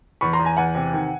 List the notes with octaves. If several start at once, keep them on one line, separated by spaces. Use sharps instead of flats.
E2 B5 C#6
A#5 C6
E2
G#5 A#5
E2 F#5 G#5
C3
D#3